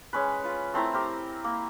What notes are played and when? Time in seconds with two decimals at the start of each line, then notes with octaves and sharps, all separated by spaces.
0.13 G#3 C#4 B4
0.44 F4 B4
0.74 A3 C4 E4 A#5
0.93 G4 A#4 C5
1.44 A#3